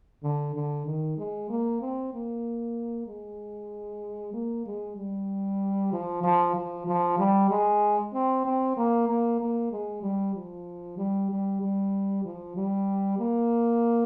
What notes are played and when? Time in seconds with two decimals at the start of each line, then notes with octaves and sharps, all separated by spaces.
0.23 D3
0.55 D3
0.86 D#3
1.18 G#3
1.50 A#3
1.81 C4
2.13 A#3
3.07 G#3
4.34 A#3
4.66 G#3
4.97 G3
5.92 F3
6.23 F3
6.56 F3
6.87 F3
7.19 G3
7.50 G#3
8.14 C4
8.45 C4
8.77 A#3
9.09 A#3
9.40 A#3
9.72 G#3
10.03 G3
10.35 F3
10.98 G3
11.31 G3
11.62 G3
12.25 F3
12.56 G3
13.19 A#3